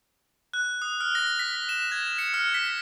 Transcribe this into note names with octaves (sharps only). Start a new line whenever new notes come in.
F#6
D#6
F6
A#6
B6
E7
G#6
C#7
F6
B6